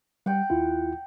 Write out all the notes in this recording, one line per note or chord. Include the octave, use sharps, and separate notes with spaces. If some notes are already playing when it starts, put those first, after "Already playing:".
G3 F#5 G5
D#2 E4 F4